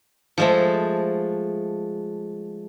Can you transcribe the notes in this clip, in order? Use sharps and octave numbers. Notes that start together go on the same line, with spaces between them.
F3 G#3 A3